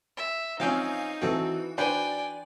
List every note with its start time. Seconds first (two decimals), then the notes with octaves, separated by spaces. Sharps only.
0.17 E5
0.60 F3 C4 C#4 D#4 F5 G#5 G6
1.22 E3 C4 E4 F#4 A4
1.78 D4 B4 C5 D5 G5 G#5